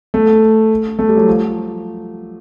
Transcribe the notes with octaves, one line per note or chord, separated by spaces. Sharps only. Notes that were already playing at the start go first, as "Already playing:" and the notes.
A3
A3
G3
F#3
F3